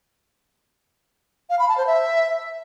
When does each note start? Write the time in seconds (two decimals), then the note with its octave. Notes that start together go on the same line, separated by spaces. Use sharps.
1.50 F5
1.59 B5
1.68 A5
1.78 C5
1.87 E5